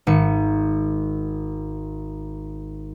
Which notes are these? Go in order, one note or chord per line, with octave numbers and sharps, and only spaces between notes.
G#1 C#7